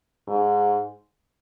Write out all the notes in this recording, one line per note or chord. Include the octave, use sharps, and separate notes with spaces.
G#2